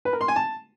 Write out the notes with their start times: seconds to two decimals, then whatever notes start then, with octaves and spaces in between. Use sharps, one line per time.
0.05 B4
0.13 A#4
0.21 C6
0.28 G#5
0.36 A5